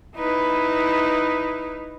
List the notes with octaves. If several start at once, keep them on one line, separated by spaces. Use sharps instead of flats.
D#4 E4 B4